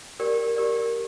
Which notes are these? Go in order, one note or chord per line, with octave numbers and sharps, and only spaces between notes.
G4 A#4 D5
G4 A#4 D5